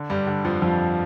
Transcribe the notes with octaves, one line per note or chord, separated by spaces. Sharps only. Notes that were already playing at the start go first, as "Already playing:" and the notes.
Already playing: D3
G2 G3
D3
F2 F3
F2 F3